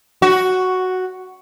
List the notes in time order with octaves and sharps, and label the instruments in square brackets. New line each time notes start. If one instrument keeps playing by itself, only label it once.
[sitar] F#4